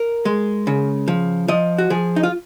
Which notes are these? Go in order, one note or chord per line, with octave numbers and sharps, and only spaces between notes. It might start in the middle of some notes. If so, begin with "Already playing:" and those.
Already playing: A#4
G#3
C#3
F3
F3 D#5
F#4
F3 G#4
D#4
F4